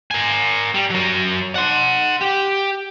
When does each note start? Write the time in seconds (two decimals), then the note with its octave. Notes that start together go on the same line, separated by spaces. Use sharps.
0.11 A#4 G#5
0.74 G3
0.90 F#3 A#4
1.55 F#5 C6
2.21 G4